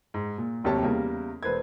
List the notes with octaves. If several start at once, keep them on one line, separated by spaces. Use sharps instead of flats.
G#2
A#2
D1 D#2 C3 G4 C#5 A5
E2 C#3 G3 A#3
E1 B4 C5 G#6